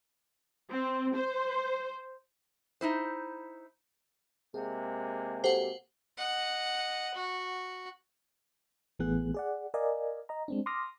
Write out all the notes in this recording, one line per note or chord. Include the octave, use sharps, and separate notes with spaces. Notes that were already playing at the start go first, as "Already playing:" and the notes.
C4
C5
D#4 E4 C5
C3 G#3 A#3 G#4
F#4 G4 A4 C5 F#5
D#5 F#5
F#4
A1 E3 A3 B3 G#4 F#6
G#4 D5 F#5
A#4 D5 D#5 F5 G#5
D#5 A#5
G#3 C4 D4
C6 D6 D#6 F6 A#6